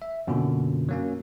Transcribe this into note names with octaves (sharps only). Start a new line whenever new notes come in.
E5
F#2 B2 D3 A#3 F4
F#3 A#3 C#4